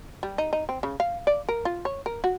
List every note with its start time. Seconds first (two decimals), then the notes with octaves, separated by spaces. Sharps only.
0.23 G3
0.38 D#4
0.53 D#4
0.69 C4
0.83 C#3
1.00 F5
1.27 D5
1.49 A#4
1.65 F4
1.85 C#5
2.06 A#4
2.24 F#4